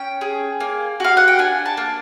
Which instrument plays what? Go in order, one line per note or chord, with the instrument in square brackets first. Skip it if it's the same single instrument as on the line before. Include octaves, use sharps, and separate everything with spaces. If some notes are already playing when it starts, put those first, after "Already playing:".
Already playing: [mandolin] C#4 G5
G#4
A#3
F#4 F5
F#5
G5
D4 G#5
A5
A#3